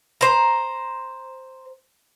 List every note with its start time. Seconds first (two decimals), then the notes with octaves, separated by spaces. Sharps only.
0.21 C5 A#5